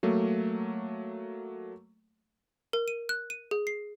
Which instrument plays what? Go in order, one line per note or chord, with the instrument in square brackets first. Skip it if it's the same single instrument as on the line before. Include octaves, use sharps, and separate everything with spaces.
[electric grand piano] F#3 A3 A#3
[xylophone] A#4
D#7
F#6
D#7
G#4
C7